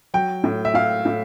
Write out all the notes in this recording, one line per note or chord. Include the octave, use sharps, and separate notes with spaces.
F#3 G5
A2
E5
A2 F5
A2